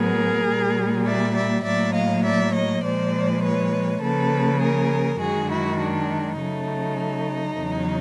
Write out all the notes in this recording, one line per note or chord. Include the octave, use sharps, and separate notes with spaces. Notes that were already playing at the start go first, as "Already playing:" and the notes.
Already playing: A2 F#3 B3 G#4 A#4
A#2 G3 A#3
D5 E5
D5 E5
A2 F#3 A#3 D5 E5
D#5 F5
D5 E5
C#5 D#5
A#2 F3 G#3 C5 D5
B4 C#5
C#3 F3 A#3 A4 B4
G#4 A#4
F#2 D#3 G#3 F#4 G#4
E4 F#4
D4
C#3 F#3 A3 D#4
E2 C#3 F#3